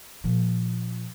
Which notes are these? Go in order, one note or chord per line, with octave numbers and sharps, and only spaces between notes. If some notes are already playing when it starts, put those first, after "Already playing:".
A#2 F3